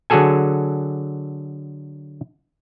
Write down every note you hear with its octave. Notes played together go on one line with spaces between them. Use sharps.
D3 F#3 F#4 G#4 A4 G#5